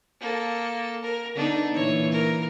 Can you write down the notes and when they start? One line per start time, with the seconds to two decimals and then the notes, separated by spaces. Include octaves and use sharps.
0.21 A#3 A4
1.03 A#4
1.36 D3 B3 D4 D#4
1.75 A#2 E3 C#5
2.12 A#4